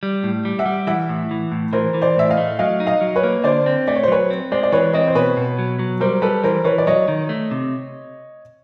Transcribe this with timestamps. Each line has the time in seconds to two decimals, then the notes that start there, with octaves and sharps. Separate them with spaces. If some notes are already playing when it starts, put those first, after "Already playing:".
0.03 G3
0.23 A2
0.45 G3
0.59 E5 F#5
0.66 G3
0.87 E3 E5 F#5
1.09 A2
1.31 E3
1.52 A2
1.73 E3 A#4 C5
1.94 E3
2.01 C5 D5
2.17 A2 E5
2.30 D#5 F5
2.37 A3
2.59 F#3 D#5 F5
2.80 D#4
2.87 D#5 F5
3.01 F#3
3.16 B4 C#5
3.23 A#3
3.44 D3 C5 D5
3.66 C4
3.88 A3 D5
3.96 C#5
4.03 C5
4.08 F#3 B4 C#5
4.30 C4
4.51 G#3 C5 D5
4.63 D5
4.72 E3 B4 C#5
4.93 C4 C#5 D#5
5.08 C5
5.15 B2 B4 C#5
5.37 B2
5.59 F#3
5.79 F#3
6.00 G3 A#4 C5
6.22 G3 A4 B4
6.44 E3 A#4 C5
6.65 E3 B4 C#5
6.78 D5
6.87 F#3 C#5 D#5
7.08 D#3
7.29 A3
7.51 C3